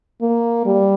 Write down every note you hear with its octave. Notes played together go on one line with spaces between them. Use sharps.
A#3
G3